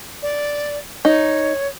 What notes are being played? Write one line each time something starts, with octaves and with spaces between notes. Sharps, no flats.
D5
D#4 C#5